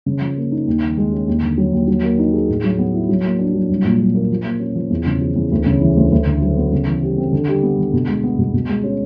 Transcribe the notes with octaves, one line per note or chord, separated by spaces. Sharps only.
C#3
F3
A#3
D#4
D#2
D#3
G#3
C#4
D#2
D3
F#3
D#2
F#3
A#3
D#4
G#4
A2
F#3
B3
E4
F#3
A#3
D4
F#3
C2
A#2
F#3
A#3
F3
A#3
C#4
F3
E2
C#3
F3
E2
D2
C#3
E3
D2
D2
D3
F#3
B3
C#3
E3
G3
C4
D3
G3
B3
D3
B2
G#3
B3
B2
B2
G#3
C#4